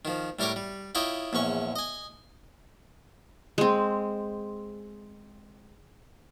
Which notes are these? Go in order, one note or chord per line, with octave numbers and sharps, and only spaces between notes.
D#3 F3
A2 G3 A#4 C#5 D6
G3
E4 F4 C#5 D#5 G5
A#1 E2 C#4 C#6
D#5 G#5
G#3 C4